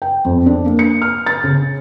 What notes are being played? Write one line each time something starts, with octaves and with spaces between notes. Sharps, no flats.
G5
F2
D4
A#3
C#7
F6
A6
C#3